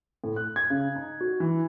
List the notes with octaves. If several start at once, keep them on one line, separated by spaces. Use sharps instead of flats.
A2
F#6
G#6
C#3
D#4
F#4
E3